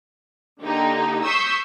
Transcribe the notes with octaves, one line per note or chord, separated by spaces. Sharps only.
D3 A#3 D#4 G4
C#6 D#6 E6 G6 B6 C7